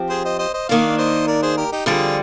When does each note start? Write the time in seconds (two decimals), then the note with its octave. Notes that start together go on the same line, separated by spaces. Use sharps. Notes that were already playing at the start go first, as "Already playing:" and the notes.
Already playing: F3 C4 G4
0.10 G#4 C5
0.25 C5 D#5
0.39 C5 D#5
0.54 C5 D#5
0.69 D#3 A#3 D4 D5 F5
0.98 C5 D#5
1.27 A#4 D5
1.42 G#4 C5
1.57 G4 A#4
1.72 D#4 G4
1.86 F2 D3 G3 F4 G#4